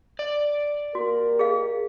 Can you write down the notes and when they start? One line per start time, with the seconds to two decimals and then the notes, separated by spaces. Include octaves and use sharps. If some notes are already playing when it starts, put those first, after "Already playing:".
0.19 D5
0.95 A#3 F#4 G4 A#4
1.39 G#4 D#5 F5